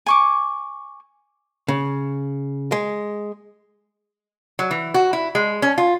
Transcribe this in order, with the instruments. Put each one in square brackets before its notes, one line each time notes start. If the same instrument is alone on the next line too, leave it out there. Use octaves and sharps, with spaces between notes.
[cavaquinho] G#5 C#6 D6
[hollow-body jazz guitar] C#3
G#3
[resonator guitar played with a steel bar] F#3
E3
F#4
E4
G#3
C#4
F4